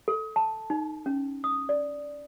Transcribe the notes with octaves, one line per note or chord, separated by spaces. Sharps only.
A4
A5
D#4
C#4
D#6
D5